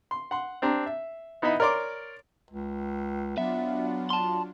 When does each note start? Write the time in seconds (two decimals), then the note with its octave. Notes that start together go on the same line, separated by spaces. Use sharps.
0.11 C6
0.31 F#5 C6
0.62 C4 D4 G4 A#5
0.86 E5
1.42 B3 D#4 E4 D#5 E5 B5
1.60 A#4 C#5 D5 C6 D6
2.51 C#2
3.38 F#3 B3 D4 F4 E5
4.10 A5 C6